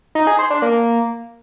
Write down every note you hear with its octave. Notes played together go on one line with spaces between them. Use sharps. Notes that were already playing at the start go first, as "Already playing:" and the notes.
D#4
G#4
C5
D4
A#3